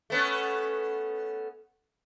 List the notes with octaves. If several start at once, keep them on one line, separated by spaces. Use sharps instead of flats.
A3 B3 C#4